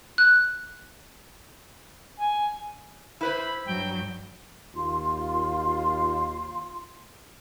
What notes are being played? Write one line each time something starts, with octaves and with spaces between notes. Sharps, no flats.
F#6
G#5
E4 B4 C5 B5
G2 F#3 G5
D#2 F4 C6